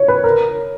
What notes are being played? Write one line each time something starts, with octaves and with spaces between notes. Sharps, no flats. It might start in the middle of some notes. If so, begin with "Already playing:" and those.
Already playing: C#5
B4
A#4